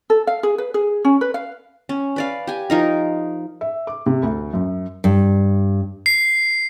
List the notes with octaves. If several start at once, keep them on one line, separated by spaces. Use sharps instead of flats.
A4
F5
G#4
B4
G#4
C#4
B4
F5
C#4
B4 D5 F5
G4 G#5
F3 D#4 A#4
E5
D6
C3
D2
F#2
G2
C7